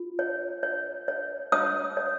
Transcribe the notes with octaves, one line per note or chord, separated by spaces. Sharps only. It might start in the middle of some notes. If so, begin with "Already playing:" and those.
Already playing: F4
C#5
C#5
C#5
C#5 D#6
C#5